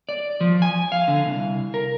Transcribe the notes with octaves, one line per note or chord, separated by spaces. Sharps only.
D5
F3
G#5
F5
D3
C2
A#4